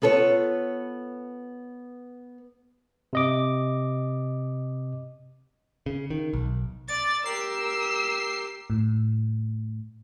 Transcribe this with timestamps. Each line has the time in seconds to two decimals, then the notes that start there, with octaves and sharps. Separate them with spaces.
0.02 B3 F4 A4 B4 C#5
3.13 C3 D#5 D6
5.86 C#3
6.10 D#3
6.33 B1
6.88 D5 A6
7.26 G4 A#4 E6 C7
8.70 A2